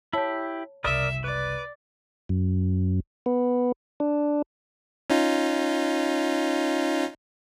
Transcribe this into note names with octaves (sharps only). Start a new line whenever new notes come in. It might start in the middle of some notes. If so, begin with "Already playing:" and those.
E4 G4 C#5 A5
F#1 C2 A#4 D5 E5 D#6
B4 D5
F#2
B3
D4
C#4 D#4 F4